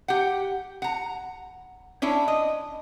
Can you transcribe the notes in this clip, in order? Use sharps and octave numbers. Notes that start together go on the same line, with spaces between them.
G4 F#5
F#5 A#5
C#4 D4 E4 C#5
D#5